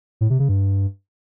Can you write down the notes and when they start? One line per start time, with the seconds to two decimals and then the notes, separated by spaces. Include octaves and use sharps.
0.21 A2
0.30 C3
0.39 C#3
0.49 G2